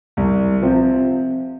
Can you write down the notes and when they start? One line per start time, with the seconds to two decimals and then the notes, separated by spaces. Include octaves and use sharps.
0.17 C2
0.62 C3 F3 C4